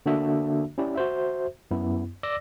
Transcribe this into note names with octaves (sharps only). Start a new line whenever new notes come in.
D3 A#3 D4 F#4 E5
C#4 E4 G4 D5
F#4 C5 E5
F#2 B3 E4
D5 D6 E6 A#6